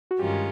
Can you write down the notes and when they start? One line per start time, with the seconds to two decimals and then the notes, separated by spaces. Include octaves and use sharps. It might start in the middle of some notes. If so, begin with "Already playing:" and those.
0.11 F#4
0.19 G2 D#3 G#3 C#4 F4 G4